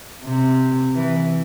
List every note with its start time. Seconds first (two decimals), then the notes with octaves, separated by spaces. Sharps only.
0.24 C3
0.94 E3